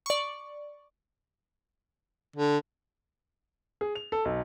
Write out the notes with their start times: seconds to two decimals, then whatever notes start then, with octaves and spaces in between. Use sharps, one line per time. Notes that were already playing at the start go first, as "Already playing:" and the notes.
0.06 D5 C#6
2.36 D3
3.81 G#4
3.95 F7
4.12 A4
4.25 B1